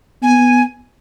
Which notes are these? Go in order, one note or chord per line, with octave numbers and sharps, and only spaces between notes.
B3 G#5